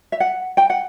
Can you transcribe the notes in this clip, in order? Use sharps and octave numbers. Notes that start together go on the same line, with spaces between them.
E5
F#5
G5
F#5